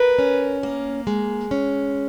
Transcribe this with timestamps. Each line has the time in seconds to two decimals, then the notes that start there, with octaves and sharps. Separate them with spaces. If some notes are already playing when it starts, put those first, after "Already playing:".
Already playing: A#4 B4
0.19 C#4
0.63 A#3
1.07 G#3
1.51 C#4